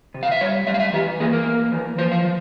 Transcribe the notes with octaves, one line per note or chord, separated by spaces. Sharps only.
C3
F5
E5
G3 C#5
G3 E5
F5
E5
E3 G4
A#3 G#4
A#4
A#3
E3
F3 C5
F5
F3